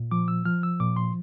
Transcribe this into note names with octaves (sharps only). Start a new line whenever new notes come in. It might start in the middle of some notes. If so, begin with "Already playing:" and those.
Already playing: A#2
F3 D6
E6
F3 F6
E6
A#2 D6
C6